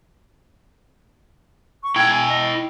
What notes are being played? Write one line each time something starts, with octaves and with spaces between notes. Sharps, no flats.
C#6
E4 G5 G#6
G#5
D#5